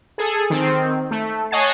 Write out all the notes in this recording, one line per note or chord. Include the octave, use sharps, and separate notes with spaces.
G#4 A4
D#3 C4
A3
C#5 D#5 F#5 G#5 A5 C7